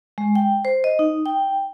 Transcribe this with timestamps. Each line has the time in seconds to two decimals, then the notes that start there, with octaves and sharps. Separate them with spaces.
0.18 G#3
0.35 G5
0.65 C5
0.84 D#5
0.99 D#4
1.26 G5